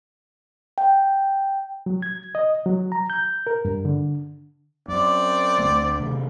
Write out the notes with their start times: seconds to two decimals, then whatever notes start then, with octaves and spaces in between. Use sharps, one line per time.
0.78 G5
1.86 F#3
2.02 G#6
2.35 D#5
2.66 F#3
2.92 A#5
3.10 G6
3.47 A#4
3.65 G2
3.85 D3
4.88 F#2 C4 D5
5.59 D2 G3 A3
6.00 C3 D#3